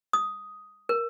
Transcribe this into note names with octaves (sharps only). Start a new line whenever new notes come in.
D#6
A#4